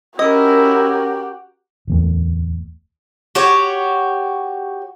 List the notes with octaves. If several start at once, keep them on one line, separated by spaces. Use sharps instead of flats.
C#4 E4 F#4 G4 A#4 D#5
D1 E2 A3
F#4 G4 C#5